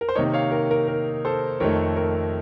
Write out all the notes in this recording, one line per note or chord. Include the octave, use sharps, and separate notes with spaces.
A#4
C5
C3 D#3 A#3 D#4 A#4 C#5
C#5 F5
A#4
A#4
A#4
A4 C5
F2 D#3 A3 A#4 C#5
A#4